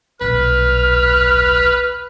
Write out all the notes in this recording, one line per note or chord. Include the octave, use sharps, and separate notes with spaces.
D#1 B1 B4 F6